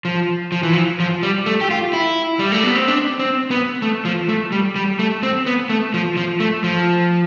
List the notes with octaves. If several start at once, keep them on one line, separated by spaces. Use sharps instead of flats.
F3
F3
E3
F3
F3
G3
A3
G4
F4
E4
G3
A3
B3
C4
D4
C4
B3
A3
F3
A3
G3
G3
A3
C4
B3
A3
F3
F3
A3
F3